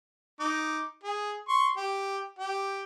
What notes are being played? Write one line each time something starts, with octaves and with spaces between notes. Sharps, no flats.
D#4 D6
G#4
C6 C#6
G4
G4